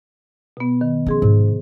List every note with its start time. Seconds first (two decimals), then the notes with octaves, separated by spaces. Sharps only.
0.57 B2 B3
0.81 D#3
1.06 F3 C#4 G#4 C6
1.22 G#2 C3